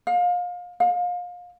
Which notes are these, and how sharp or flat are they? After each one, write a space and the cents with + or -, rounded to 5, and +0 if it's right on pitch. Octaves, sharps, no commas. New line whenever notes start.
F5 +30
F5 +30